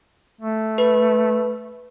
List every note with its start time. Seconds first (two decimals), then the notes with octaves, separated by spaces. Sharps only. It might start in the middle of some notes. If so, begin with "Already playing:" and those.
0.41 A3
0.78 B4